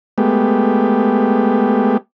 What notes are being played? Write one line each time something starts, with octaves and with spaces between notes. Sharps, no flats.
G#3 A3 B3 G4